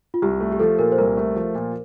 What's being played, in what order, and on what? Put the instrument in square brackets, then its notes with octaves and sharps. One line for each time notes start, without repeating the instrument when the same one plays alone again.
[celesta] F4
[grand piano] C2 [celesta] G4
[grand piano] A3
[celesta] G4
[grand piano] F3 [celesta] A4
[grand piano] A#2 [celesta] A#4
[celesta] C5
[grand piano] C2 [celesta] A#4
[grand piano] A3
F3
A#2